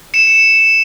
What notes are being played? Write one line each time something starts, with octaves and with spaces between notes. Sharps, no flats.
C#7 E7